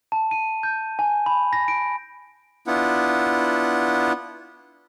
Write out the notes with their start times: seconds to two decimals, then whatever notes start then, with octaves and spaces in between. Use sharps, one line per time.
0.12 A5
0.31 D#7
0.63 G6
0.99 G#5
1.26 B5
1.53 A#6
1.68 D7
2.67 B3 D4 E4 F4 F#5